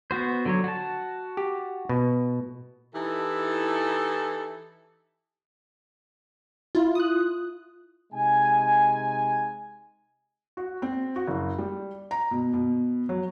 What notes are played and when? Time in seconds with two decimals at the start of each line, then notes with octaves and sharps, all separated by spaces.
0.11 B3 F#4 C5
0.45 D3 F#3 C#5
0.64 F#4 A5
1.37 G4
1.89 B2
2.95 E3 D#4 E4 G4 A4
6.75 E4 F4
6.95 D#6 F#6
8.13 C3 G#3 D#4 G#5
10.57 F#4
10.82 C4
11.16 F#4
11.27 F#1
11.58 G3
12.11 A#5
12.31 B2
12.53 B2
13.09 F#3